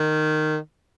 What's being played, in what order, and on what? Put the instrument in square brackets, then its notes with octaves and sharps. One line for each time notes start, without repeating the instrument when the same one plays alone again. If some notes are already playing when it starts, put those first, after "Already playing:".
Already playing: [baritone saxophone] D#3